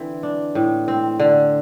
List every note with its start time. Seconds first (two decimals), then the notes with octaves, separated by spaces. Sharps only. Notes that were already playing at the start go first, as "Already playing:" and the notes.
Already playing: D3 E3 C4
0.23 D4
0.55 A2
0.88 C4
1.20 D3